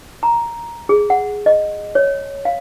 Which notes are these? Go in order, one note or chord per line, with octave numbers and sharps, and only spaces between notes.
A#5
G#4
F#5
D#5
C#5
F5